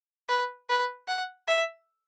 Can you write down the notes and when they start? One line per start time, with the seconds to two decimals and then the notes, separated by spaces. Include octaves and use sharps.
0.29 B4
0.69 B4
1.08 F#5
1.48 E5